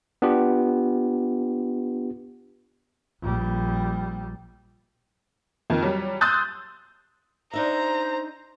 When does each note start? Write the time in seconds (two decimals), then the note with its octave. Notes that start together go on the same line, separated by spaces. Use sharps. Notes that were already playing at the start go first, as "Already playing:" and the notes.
0.22 B3 D4 F4 G4
3.21 A#1 G3
5.70 F2 D#3
5.82 F#3 G3
6.21 C6 D#6 E6 F#6 G6 A6
7.53 D4 D#4 C5 E5 A#5